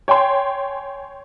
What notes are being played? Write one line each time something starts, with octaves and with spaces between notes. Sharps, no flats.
C#5 G5 G#5 C6